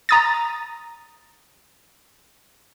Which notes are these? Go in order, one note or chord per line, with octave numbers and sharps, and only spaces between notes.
A#5 D#6 A6